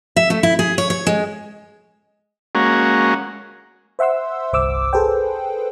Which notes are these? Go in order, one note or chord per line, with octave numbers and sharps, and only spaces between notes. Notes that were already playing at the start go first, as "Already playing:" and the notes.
E5
A3
E4
G#4
C#5
C#5
G#3
G#3 A#3 C#4 F#4
C5 E5 F#5 C6 E6
G1 C2 C5 D6 E6
G#4 A4 B4 C5 G5